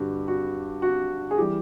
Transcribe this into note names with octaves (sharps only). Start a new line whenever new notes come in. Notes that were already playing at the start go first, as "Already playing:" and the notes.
Already playing: G2 D3 G3 F#4 G4
F#4
F#4
G#4
E3 G3 G4